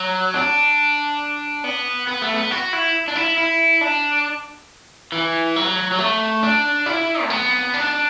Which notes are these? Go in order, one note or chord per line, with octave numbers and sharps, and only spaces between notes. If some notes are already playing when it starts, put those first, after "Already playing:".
Already playing: F#3
D4
B3
B3
A3
B3
F#4
E4
D4
E4
E4
D4
E3
F#3
F#3
A3
D4
E4
A3
B3
D4